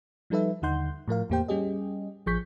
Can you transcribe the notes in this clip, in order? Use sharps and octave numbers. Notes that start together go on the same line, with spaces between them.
F3 G3 D#4 A4 B4 E5
D#2 D3 D#4 F#5 C6 G6
A2 F3 A#4 F5
E2 A2 A#3 G4 C5 G5
G3 C#4 G4 G#4 D#5
A1 F3 G#4 C#6 G6 B6